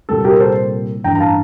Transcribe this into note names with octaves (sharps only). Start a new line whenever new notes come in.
C2 A#2 G3 A#3 A4
G4 A#4
A4 C5
A1 G2 E3 G5 A#5
A#5
F5 A5